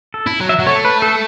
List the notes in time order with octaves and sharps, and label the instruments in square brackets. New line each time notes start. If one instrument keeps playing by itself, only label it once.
[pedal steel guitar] A4
[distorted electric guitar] E4
F#3
[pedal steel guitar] E5
[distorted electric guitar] F#3
[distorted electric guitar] A3 [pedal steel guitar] C#5
[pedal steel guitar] B4
A4